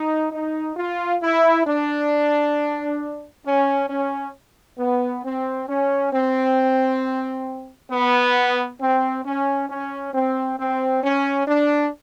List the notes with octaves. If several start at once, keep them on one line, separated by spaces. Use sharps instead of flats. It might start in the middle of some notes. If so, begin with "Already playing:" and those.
Already playing: D#4
D#4
F4
E4
D4
C#4
C#4
B3
C4
C#4
C4
B3
C4
C#4
C#4
C4
C4
C#4
D4